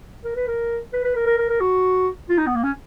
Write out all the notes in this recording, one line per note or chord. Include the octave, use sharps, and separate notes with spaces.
A#4
B4
A#4
B4
B4
A#4
A#4
A#4
A#4
F#4
F4
D#4
B3
A#3
C#4